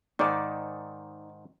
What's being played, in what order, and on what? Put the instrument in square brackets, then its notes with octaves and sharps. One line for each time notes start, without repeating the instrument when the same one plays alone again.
[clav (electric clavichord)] G#2 D#3 [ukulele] D#4 D5